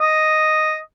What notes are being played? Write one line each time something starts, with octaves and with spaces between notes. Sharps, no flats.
D#5